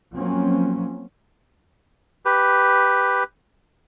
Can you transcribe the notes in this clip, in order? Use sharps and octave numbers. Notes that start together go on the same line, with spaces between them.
F3 F#3 A#3 C4 C#4
G4 B4